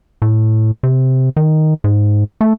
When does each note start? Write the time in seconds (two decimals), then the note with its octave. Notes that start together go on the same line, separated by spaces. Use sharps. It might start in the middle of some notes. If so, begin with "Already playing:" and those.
0.22 A2
0.83 C3
1.37 D#3
1.84 G#2
2.41 A3